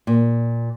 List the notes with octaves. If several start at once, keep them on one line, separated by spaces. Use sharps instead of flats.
A#2